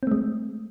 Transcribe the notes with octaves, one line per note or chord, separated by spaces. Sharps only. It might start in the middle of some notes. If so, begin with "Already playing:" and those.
G#3 A3 C4